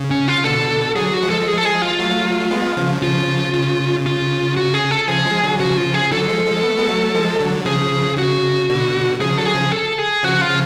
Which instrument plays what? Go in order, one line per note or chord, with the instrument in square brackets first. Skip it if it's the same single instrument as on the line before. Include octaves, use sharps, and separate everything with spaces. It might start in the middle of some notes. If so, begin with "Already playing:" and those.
Already playing: [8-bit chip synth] C#3
[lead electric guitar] C#4
F4
[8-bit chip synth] B2 D3 [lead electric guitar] A4
[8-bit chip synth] D3 F#3 [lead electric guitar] G#4
[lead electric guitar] F#4
[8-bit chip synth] F3 G#3
[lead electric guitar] A4
G#4
A4
G#4
F4
[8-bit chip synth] F#3 A3
A3
G#3 B3
C#3 F3
[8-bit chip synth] C#3 F3 [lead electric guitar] F4
[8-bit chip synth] C#3
[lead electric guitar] F4
F#4
G#4
A4
[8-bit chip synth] C#3 F3 [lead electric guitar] G#4
[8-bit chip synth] F3 G#3
D3 F#3
[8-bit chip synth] C#3 F3 [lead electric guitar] F#4
[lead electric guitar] F4
G#4
[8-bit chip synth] D3 F#3 [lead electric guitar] A4
[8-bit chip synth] F3 G#3
F3 G#3
B3
A3
G#3 B3
F#3 A3
F3 G#3
D3 F#3
[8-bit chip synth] C#3 F3 [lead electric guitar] G#4
[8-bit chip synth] C#3 [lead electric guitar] F#4
[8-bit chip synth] B2 D3
[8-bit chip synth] C#3 F3 [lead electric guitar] G#4
[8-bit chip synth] D3 F#3 [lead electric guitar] A4
[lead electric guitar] G#4
[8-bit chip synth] C#3 F3
[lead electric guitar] A4
G#4
[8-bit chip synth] C#3 F3 [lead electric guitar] F#4
[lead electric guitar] F4
[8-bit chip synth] C#3 F3